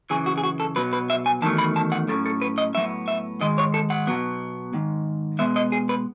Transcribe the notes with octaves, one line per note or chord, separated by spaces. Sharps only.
F#2 C#3 E3 G#4
F#4
G#4
F#4
A4
B2 F#3 B3 B4
B4
E5
G#5
E2 D#3 F#3 A3 A5
B5
A5
F#5
A2 F#3 C#4 A4
A4
B4
D#5
A2 F#3 B3 E5
E5
G#2 D#3 G#3 D#5
C#5
A4
F#5
B2 F#3 B3
G#2 D#3
B2 G#3 B3 E5
D#5
G#4
B4